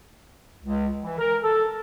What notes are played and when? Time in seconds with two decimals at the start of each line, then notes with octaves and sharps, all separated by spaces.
0.64 C#2
1.03 E3
1.18 A#4
1.43 A4